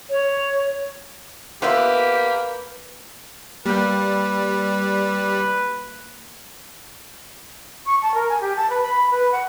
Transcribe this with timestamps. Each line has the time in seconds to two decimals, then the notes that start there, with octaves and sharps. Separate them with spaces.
0.09 C#5
1.62 A#3 B3 F4 G4 B4 E5
3.66 G3 A#3 B4 G5
7.86 C#6
8.02 A5
8.14 A#4
8.29 G#5
8.41 G4
8.56 A5
8.70 B4
8.83 B5
9.11 B4
9.32 F#5